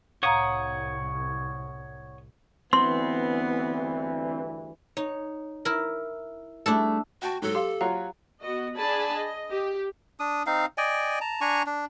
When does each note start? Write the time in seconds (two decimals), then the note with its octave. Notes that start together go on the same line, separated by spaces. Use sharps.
0.23 C2 A2 C#5 F5 F#5 A#5 D#6
2.73 D2 G2 E3 B3 C4 C6
4.97 D#4 C#5
5.65 E4 A#4
6.66 G3 A3 D4 E4 G#4 A4
7.22 F#4 F#5 G5 A5
7.42 G#2 F#3 A4
7.55 G4 F5 C6
7.81 F#3 F4 C#5 F5 F#5 A#5
8.40 B3 F#4 D#5
8.76 D4 G#4 D5 G#5 A5 B5
9.16 D#5
9.51 G4
10.20 D4 D#6
10.46 C4 D#4 F5
10.78 D5 D#5 G5 G#5
11.21 A5 A#5
11.41 D4 G#5 A#5 C#6
11.66 D4